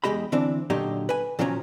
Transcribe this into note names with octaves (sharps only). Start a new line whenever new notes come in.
E2 G#3 G4 D#5 B5
D3 E3 C4 D4
A#2 D3 F#3 D#4 G4
B4 G#5
A#2 D#3 F3 F#3 C#4